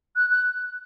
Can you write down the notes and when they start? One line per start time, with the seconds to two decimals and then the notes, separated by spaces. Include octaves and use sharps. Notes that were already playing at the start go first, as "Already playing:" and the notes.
0.16 F#6
0.31 F#6